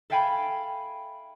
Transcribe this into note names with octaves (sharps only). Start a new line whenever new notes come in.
A4 E5 F5 G5 G#5 B5